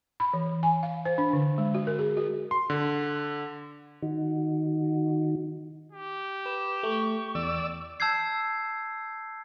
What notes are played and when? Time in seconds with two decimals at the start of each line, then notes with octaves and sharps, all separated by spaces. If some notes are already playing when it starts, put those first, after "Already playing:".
0.20 B5
0.33 E3
0.63 G#5
0.83 F5
1.05 C5
1.18 D4
1.33 D3
1.58 G#3
1.75 F#4
1.87 A#4
1.99 G#4
2.17 F#4
2.51 C6
2.70 D3
4.02 D#3 D#4 F#4
5.92 G4
6.46 B4 E7
6.83 A3 C#6
7.35 E2 D5 E6
8.00 A5 E6 G6 G#6 C7